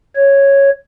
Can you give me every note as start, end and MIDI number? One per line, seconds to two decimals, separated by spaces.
0.16 0.70 73